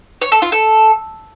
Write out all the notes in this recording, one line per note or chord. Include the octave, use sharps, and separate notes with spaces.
C#5
A4
F4
A4